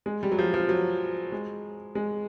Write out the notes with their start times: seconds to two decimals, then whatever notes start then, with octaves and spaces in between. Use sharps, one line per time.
0.06 G#3
0.23 G3
0.32 F#3
0.39 F3
0.54 F3
0.69 F#3
1.32 G#3
1.95 G#3